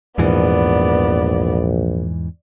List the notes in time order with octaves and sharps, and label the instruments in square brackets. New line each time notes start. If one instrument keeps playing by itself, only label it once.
[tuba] A#1 [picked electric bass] E2 G#2 E3 [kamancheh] B3 D5